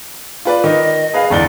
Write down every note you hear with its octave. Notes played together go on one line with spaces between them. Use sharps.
F4 B4 D5
D#3 D#5
G#4 B4 F5
G1 E2 D5 G7